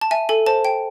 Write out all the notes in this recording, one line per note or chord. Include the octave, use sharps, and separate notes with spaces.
A5
E5 G#5
A4 G#5
C5 A5
G5